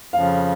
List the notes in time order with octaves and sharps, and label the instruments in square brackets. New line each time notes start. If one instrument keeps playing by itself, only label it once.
[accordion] F2 C#3 F3 [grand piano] F5